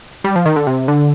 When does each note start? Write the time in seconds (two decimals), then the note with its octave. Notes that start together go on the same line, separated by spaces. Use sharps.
0.24 G3
0.36 F3
0.46 D#3
0.56 D3
0.67 C3
0.88 D3